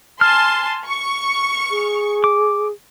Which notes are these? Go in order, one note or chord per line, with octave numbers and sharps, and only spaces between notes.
G#5 A5 C6 F6
C#6
G#4
D6